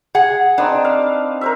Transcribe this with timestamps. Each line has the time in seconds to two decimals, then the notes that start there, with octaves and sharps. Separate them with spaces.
0.15 G#4 F#5
0.58 C4 D4 D#4 B4
0.85 F5
1.41 A#4 C5 E5